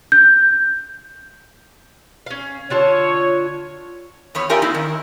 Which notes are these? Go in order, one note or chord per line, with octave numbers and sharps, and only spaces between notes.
G6
C#4 F5
D3 F4 C#5 A5
E2 B3 C#5
C#4 F4 G4 A#4 D5 E5
A#3 C4 D#4 E4
D#3